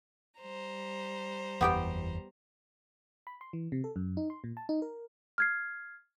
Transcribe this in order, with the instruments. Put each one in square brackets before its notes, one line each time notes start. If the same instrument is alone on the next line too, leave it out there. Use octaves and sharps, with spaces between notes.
[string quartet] G3 C5 A#5
[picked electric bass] F#1 E2 [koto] B3 G4 G5
[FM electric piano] B5
C6
E3
C3
A4
F#2
D#4
C6
A#2
A5
D#4
A#4
[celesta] F6 G#6 C7